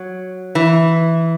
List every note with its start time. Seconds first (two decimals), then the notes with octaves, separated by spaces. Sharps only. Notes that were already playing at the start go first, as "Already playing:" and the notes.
Already playing: F#3
0.55 E3